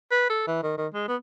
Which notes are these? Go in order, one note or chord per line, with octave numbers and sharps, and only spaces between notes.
B4
A4
E3
D#3
D#3
G#3
B3